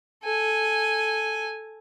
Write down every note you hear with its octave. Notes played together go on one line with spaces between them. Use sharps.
A4 G#5